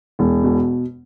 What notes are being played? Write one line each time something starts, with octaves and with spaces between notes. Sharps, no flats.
E1
B2